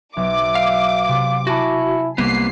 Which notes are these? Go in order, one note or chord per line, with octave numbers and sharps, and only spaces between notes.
B1 E5 D6
F5
C3
E4 F#4 G#5 A5 B5
C2 A#3 B3 C7